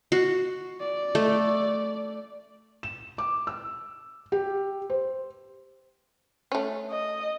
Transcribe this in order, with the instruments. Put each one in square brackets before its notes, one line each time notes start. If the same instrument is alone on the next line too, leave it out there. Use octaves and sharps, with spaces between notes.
[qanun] F#4
[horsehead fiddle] D5
[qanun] A3
[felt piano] E7
D6
E6
G4
C5
[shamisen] A3 C#4
[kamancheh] D#5